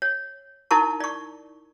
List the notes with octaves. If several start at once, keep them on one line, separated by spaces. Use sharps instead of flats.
C#5
D#4 E4 A#4 A5 C#6
D5 C#6